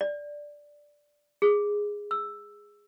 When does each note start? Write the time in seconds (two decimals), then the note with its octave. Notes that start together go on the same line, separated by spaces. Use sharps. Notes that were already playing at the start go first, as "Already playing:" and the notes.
0.01 D5
1.42 G#4
2.11 E6